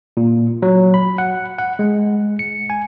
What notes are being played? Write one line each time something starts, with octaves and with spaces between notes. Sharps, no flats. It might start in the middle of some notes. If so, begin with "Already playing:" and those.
A#2
F#3
B5
F#5
F#5
G#3
C#7
G#5